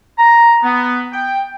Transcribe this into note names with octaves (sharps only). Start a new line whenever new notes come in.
A#5
B3
G5